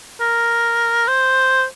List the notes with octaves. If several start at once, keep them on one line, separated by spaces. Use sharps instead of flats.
A#4
C5